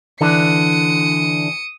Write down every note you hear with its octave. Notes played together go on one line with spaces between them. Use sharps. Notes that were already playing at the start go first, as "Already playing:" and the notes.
D3 E3 D4 D#6 C#7